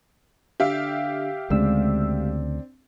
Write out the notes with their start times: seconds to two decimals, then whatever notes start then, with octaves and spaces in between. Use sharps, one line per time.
0.60 D3 G4 E5 F5
1.50 D2 C#3 G#3 C4 D4 E6